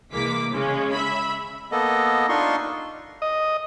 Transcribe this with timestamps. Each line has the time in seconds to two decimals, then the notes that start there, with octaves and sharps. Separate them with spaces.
0.11 C2 E3 G#3 A#3 D6 B6
0.50 C#3 G#3 C#4
0.92 E5 B5
1.72 A#3 B3 A4 D#5
2.29 D4 D#4 F4 C6 C#6
3.22 D#5